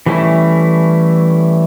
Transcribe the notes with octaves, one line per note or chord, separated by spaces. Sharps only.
E3 G3 A3 C#4 E4